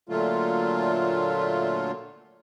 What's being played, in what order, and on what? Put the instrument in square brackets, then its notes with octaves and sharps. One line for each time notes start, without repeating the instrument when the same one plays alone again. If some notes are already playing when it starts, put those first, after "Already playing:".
[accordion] A#2 D3 F#3 A3 F4